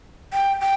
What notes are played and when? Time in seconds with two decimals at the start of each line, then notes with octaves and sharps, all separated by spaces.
0.33 G5
0.61 G5